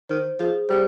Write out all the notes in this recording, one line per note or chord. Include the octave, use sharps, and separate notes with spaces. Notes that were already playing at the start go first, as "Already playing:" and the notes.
D#3 C5
F3 G#4
G3 C5